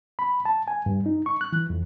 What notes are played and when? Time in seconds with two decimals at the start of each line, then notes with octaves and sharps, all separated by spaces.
0.19 B5
0.45 A5
0.68 G#5
0.86 G2
1.06 D#4
1.26 C#6
1.41 F#6
1.53 E3
1.70 F2